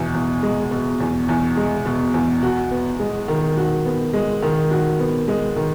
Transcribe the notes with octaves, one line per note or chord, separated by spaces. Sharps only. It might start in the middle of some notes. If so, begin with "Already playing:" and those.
Already playing: E2 B2
E2
G#3
B2
E2
E2
G#3
B2
E2
F#4
B3
G#3
D#3
F#4
B3
G#3
D#3
F#4
B3
G#3
D#3